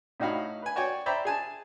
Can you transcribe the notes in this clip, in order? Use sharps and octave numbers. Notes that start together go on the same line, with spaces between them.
A2 D#4 F#4 F5 B5
B4 G#5
F#4 C#5 D5 G5 G#5
C5 D5 E5 G5 A#5 B5
G#4 G#5 A5